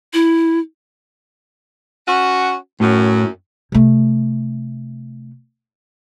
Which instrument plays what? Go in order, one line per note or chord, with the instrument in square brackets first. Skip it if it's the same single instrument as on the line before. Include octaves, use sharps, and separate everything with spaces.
[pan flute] E4
[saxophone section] C#4 F#4
[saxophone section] F#2 [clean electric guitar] A2
[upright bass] C3 A3